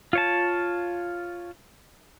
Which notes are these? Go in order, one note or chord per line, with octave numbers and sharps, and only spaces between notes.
F4 C#5 A5